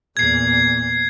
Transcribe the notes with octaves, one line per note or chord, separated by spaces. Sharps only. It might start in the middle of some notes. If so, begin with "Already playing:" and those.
E2 A#2 G#6 C7